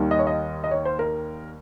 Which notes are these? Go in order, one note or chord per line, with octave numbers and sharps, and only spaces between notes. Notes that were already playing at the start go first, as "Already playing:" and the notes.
Already playing: D#2 D#3 G3
D#5
C#5
D#5
D#5
C#5
C5
A#4